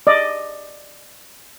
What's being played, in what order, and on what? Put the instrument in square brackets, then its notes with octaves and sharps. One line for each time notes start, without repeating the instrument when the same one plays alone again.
[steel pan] D5 D#5